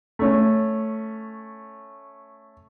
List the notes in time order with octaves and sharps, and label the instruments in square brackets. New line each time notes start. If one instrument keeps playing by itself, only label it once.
[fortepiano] A3 C#4